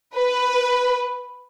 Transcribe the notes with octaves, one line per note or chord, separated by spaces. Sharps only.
B4